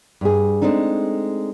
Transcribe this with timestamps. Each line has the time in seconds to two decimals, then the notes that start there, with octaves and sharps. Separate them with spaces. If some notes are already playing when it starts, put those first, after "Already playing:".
0.21 G2 G#4
0.62 G#3 A3 C4 D4 D#4